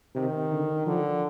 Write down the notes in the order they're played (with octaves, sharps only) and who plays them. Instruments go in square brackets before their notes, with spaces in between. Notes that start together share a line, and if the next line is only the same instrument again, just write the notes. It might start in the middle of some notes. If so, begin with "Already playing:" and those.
[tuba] C3 [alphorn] D#3
[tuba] D3
[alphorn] D3 [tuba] F3